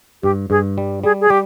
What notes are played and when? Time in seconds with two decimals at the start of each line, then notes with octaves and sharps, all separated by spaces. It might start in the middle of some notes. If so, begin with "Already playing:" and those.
0.23 G2 G4
0.50 G2 G#4
0.78 G3
1.04 G3 G#4
1.21 G#4
1.30 G3 G4